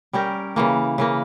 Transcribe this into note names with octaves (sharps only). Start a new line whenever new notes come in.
G3 C#4 G4 A#4
C#3 E3 A#3
C#3 E3 A#3